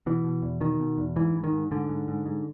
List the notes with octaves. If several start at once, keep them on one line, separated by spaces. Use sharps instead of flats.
B2 E3
B2
E2
B2 D#3
B2
E2
G#2 E3
G#2
D#3
G#2
G#2 D3
G#2
G#2
G#2